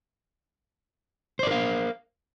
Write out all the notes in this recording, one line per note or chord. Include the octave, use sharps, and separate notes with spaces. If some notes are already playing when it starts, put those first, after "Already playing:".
A#4 C5 D5 F5